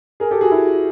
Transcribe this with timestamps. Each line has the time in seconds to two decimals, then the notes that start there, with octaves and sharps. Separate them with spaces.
0.20 G#4 A#4
0.31 G4 A4
0.41 F#4 G#4
0.51 E4 F#4